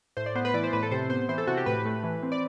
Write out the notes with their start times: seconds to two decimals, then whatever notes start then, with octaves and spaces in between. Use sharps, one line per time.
0.17 A2 C5
0.26 D5
0.35 B3 C5
0.45 B4
0.54 E3 D5
0.64 C5
0.73 A2 B4
0.83 A4
0.91 C3 C5
1.10 B3 C5
1.29 E3 C5
1.38 A4
1.47 C3 F#4
1.57 G4
1.66 A2 B4
1.85 A3
2.03 E3
2.23 C4
2.32 D5